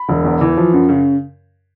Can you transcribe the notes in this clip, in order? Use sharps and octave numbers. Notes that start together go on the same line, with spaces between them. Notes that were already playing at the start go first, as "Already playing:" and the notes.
Already playing: B5
E1
E2
E3
F3
F#2
C#3